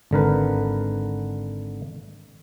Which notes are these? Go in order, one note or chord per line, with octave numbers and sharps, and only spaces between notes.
G#1 D3 A#4 B4